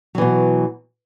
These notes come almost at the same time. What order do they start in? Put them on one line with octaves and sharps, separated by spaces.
F#3 E3 B2